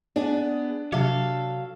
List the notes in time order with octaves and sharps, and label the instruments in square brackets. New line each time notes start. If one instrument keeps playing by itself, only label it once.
[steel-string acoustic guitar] B3 G#4 [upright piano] D4
[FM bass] C3 [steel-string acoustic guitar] F#3 A4 [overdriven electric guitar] F5